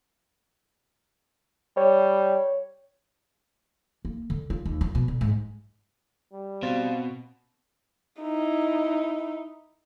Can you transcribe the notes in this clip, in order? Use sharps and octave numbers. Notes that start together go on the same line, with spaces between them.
G3 C#5
A#3
D3
F4
D#2
F3
B2
D3
G#2
G3
B2 C4 C5 F5 A6
D#4 E4